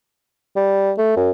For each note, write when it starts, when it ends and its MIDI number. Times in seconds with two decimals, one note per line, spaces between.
0.56 0.91 55
0.98 1.12 57
1.17 1.31 42